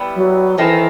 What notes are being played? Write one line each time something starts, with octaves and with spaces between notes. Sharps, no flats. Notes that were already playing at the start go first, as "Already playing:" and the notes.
Already playing: G3 B3 E4
F#3
D#3 E3 A3 C4 D#4